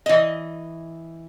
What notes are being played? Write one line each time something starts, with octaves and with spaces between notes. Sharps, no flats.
E3 D#5